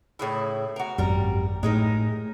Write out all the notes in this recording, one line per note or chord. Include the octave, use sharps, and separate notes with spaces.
A2 C#3 E4
F#4 A#4
G#1 F#2 G3 A#4
A2 G#3 D#4 A#4